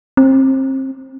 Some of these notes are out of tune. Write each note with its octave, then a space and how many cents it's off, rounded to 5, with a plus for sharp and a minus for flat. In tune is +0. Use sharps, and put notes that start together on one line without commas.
C4 +30